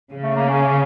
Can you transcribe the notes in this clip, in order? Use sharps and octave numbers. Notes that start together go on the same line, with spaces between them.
C#3
A3
A#3
C#4